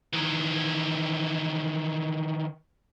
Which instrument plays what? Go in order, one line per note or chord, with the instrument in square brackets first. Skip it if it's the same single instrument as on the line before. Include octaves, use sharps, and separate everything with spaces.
[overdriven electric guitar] D#3 E3